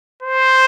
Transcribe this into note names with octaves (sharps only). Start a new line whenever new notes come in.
C5